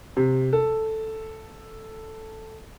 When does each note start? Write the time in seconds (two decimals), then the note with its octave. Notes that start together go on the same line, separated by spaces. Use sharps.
0.17 C3
0.53 A4